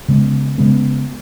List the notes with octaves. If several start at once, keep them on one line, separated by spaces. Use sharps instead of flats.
C#3 G#3 B3
C#3 G#3 B3